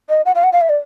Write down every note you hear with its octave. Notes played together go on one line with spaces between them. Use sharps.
D#5
F#5
F5
F#5
F5
E5
D5